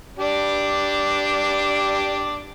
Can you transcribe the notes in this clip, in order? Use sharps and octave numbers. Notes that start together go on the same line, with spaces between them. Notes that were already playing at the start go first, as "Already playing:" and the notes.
D4 G4 D5